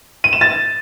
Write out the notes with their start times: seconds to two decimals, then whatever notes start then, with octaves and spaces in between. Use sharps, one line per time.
0.24 D#7
0.33 E7
0.41 A6